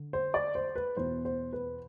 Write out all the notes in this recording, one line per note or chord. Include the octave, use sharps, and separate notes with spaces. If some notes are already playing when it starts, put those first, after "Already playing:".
Already playing: D3
C5
D5
C5
B4
E2 B2 C5
C5
B4